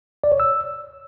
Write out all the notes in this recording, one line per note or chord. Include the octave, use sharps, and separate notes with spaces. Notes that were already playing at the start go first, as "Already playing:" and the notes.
D5
C#5
E6